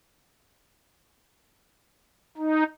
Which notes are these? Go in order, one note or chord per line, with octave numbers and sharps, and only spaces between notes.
D#4